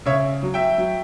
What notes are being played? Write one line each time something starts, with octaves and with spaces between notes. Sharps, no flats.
C#3 C#5 E5
F#3
E5 G5
F#3